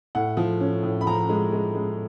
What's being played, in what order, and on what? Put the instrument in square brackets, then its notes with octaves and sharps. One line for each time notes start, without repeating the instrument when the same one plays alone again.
[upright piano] A2 F#5
F3
C#4
A2
B5
F3 A#5
G#3
G#3
G#3